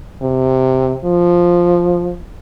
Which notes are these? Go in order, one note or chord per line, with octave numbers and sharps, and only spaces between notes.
C3
F3